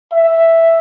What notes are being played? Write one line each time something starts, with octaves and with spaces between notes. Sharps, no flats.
E5